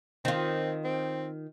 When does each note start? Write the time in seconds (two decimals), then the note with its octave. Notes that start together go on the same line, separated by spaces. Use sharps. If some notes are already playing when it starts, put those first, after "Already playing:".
0.25 D#3 C4 F4
0.84 C4